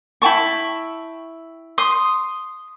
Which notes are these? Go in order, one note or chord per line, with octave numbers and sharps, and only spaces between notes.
E4 G5 A5 C#6
C6 D#6